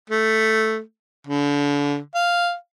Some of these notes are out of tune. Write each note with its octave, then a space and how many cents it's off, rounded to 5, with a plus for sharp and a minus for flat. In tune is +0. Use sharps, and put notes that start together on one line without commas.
A3 +0
D3 -35
F5 +0